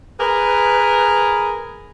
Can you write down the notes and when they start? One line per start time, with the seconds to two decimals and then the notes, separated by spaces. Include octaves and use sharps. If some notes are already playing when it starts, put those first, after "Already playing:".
0.20 G#4 A#4 B4